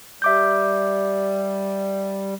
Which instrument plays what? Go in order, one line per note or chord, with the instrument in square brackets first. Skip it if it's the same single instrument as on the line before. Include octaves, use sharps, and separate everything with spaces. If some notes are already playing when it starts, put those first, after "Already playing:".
[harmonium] G3 [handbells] E5 D6 G6